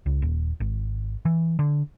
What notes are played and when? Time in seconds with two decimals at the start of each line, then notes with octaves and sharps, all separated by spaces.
0.06 C#2
0.22 D#1
0.60 G#1
1.25 E3
1.59 D3